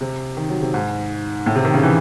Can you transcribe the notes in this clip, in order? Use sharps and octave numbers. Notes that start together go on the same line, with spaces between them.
C3
D#3
F#3
C3
G#2
A2
C3
D#3
C#3
E3